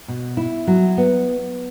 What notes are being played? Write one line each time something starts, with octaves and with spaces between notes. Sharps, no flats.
B2
E4
F#3
B3